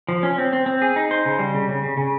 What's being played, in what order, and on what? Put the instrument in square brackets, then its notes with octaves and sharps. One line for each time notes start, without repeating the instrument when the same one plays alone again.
[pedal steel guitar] F3
C#4
C4
C4
C4
G#4
D#4
C5
C#3
G3
C#3
C#3
C#3
C#3